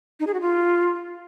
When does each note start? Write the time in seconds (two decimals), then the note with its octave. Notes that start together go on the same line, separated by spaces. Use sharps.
0.20 D#4
0.27 G#4
0.34 F#4
0.41 F4